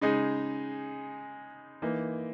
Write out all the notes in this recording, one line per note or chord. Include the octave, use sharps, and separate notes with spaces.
C#3 G#3 D#4 G#4
E3 A#3 D#4